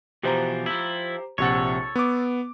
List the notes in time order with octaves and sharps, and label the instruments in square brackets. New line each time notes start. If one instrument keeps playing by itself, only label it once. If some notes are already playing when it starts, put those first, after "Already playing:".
[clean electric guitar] B2 E3 F3 [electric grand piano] G4 C5 A#5
[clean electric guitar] F3 E4
[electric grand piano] A#1 C3 F#5 [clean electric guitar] A4 C#5
[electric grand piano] B3 D6